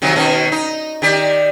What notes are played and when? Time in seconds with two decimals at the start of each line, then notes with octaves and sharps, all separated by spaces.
0.02 C3 D#3 F#3
0.16 B2 D#3 C#4
0.52 D#4
1.02 D#3 G4 D5